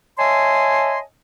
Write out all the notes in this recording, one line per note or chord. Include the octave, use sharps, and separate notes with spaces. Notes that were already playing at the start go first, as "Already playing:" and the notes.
C#5 D#5 E5 G#5 A5 C6